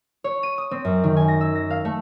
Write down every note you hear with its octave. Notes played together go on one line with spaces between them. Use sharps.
C#5
D#7
D#6
C4
F#2
D#3
G#5
A#6
E6
A#6
F5
A3